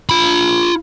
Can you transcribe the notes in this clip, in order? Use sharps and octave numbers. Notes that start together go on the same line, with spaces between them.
F4 B5